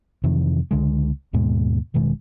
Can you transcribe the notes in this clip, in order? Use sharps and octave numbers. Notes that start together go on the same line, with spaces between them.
F2 C3 D#3 E3
C#2 D3 G#3
D#2 G#2 B2 G#3
F1 B2 D#3 G#3